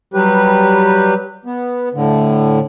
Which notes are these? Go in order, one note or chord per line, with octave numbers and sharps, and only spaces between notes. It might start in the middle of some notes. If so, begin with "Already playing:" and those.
F#3 G3 G4 B4
B3
A2 D3